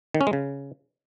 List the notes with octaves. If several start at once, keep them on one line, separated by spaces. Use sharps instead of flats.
D#3
C#4
G#3
C#3